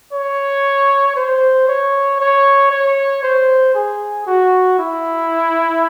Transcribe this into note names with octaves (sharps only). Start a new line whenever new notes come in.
C#5
C5
C#5
C#5
C#5
C5
G#4
F#4
E4